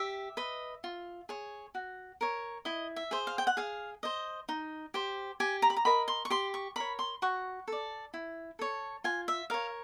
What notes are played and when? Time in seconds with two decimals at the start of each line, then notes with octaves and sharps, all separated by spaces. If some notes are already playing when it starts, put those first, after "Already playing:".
Already playing: G4 E5
0.37 B4 D#5
0.84 F4
1.29 G#4 C#5
1.75 F#4
2.21 A#4 C#5
2.65 E4 D#5
2.96 E5
3.11 G#4 C5
3.27 F5
3.38 G5
3.47 F#5
3.57 G#4 F5
4.03 C5 D#5
4.49 D#4
4.94 G4 C5
5.40 G4 G#5
5.62 A#5
5.70 B5
5.76 A#5
5.85 A#4 D#5 B5
6.08 C6
6.25 C#6
6.30 G4 C6
6.54 C#6
6.76 A#4 C#5 B5
6.99 C6
7.22 F#4 C#6
7.68 A4 D5
8.14 E4
8.59 A4 C#5
9.04 F4 G#5
9.28 E5
9.50 A#4 C#5 F5